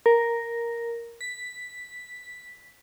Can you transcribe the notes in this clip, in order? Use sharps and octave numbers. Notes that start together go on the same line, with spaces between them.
A#4
B6